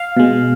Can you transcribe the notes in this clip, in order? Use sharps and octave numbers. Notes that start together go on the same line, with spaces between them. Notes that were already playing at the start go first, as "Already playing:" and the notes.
Already playing: F5
B2 G#3